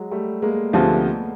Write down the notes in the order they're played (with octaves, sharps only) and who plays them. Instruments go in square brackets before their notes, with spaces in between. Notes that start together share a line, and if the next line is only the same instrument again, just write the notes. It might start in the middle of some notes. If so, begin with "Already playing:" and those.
Already playing: [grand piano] F#3 G#3
G3 A3
G#3 A#3
[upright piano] D2 C3 F3 [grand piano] A3 B3